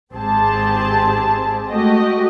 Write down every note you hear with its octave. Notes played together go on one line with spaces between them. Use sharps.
G#1 G#2 C4 G4 G#4 A5
G#3 A3 F#4 G4 D#5